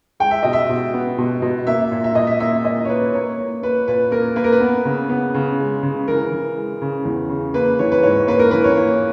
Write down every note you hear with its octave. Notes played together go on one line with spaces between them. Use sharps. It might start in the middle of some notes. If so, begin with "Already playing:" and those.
G#3 G5
E5
B2 D#5
E5
B2
B3
B2
B2
A#3 E5
A#2
E5
A#2 D#5
E5
A#3 E5
A#2 D#5
C#5
A#3 B4
A#3 C#5
A#3
A#3 B4
A#2 B4
A#3 A#4
A#3 B4
A#4
B4
B3
C#3
B3
C#3
G#3
C#3
E3 A#4
E3
G#3
C#3
E2
C#3
A#3 B4
E3 C#5
B4
G#2 C#5
A#3 B4
A#4
E3 B4
C#5
A#3